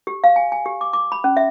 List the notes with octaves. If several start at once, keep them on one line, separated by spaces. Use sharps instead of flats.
G4
F5
G#5
G#5
G4
D6
D6
B5
C#4
E5